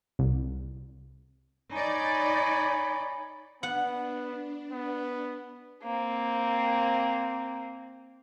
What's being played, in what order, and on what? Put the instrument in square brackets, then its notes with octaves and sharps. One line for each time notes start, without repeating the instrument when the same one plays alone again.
[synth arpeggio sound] C2
[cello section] D#4 D5 [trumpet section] C#5 G#5 B5
[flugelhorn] B3 [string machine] D4 [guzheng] F#5
[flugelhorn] B3
[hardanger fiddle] A#3 C4